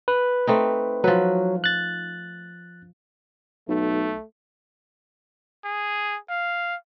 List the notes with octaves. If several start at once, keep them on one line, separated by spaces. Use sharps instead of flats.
B4
A3 C4 D#4
F3 F#3 B4
F#6 A6
B1 A3
G#4
F5